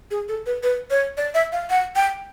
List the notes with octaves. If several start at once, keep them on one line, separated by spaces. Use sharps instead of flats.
G#4
A4
B4
B4
C#5
D5
E5
F5
F#5
G5